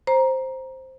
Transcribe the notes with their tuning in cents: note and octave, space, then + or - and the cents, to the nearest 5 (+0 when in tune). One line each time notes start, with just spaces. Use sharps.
C5 +5 A#5 +15